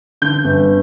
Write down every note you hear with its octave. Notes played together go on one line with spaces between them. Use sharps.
D3 G6
G1